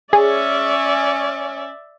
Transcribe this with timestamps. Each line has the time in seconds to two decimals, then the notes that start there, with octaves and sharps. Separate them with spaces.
0.13 C#4 G#4 D5 E5